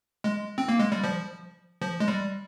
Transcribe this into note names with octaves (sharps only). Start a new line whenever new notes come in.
G#3
C4
A#3
G#3
G3
F3
F3
G#3
G3